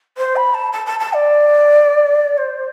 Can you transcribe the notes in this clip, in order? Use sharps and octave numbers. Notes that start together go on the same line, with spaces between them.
C5
B5
A5
A5
A5
A5
D5
C5